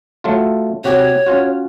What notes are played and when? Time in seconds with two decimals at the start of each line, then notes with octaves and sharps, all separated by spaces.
0.24 F#3 A3 F4
0.84 C3 F#4 G4 C#5
1.26 C#4 F4 F#4